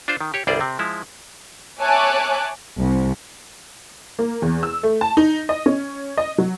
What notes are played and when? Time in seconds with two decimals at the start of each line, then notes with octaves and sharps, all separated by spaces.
0.08 D4 F4 C5
0.21 D#3
0.34 G4 C#5
0.47 G1 C2 G3 G#4 C5 D5
0.61 C3 C4
0.79 F3 G#3 E4
1.80 C#5 E5 G#5 A5 D6 F#6
2.77 C2
4.19 A#3
4.42 E2
4.63 E6
4.83 A3
5.01 A5
5.17 D#4
5.49 D#5
5.66 C#4
6.17 D#5
6.38 F#3